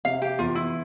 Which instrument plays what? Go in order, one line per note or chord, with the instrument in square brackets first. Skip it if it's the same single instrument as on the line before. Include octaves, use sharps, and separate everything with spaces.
[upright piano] C3 [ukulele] F5
[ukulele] G4
[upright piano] E2 [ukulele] F4
[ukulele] E4